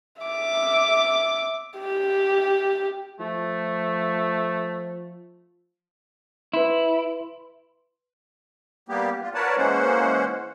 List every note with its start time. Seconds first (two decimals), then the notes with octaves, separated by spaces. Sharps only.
0.22 E5 D6
1.80 G4
3.20 F3 A3
6.54 E4 B4 C6
8.89 G3 A#3 B3 G4
9.22 F4
9.34 A#4 B4 C#5 D5 F#5 A5
9.57 E3 G#3 A#3 C#4 C5 F#5